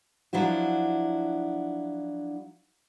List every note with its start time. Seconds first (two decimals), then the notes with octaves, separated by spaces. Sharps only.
0.33 F3 F#3 D4 E4 F#4